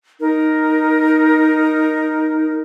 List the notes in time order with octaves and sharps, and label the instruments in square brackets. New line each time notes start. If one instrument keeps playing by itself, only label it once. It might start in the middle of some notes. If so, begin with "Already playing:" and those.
[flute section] D#4 A#4